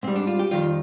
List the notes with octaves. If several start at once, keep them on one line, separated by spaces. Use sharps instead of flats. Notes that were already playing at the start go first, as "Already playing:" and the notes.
G#2 G3 C4
D4
F4
G4
F2 D#3 G3 F4